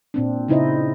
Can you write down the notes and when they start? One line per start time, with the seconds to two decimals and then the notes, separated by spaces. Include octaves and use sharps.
0.14 A#2 C4 D4
0.48 C#3 D#4 E4 C5 D#5